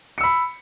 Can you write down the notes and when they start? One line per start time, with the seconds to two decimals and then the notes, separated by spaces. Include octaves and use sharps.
0.18 C#7
0.21 E6
0.23 B5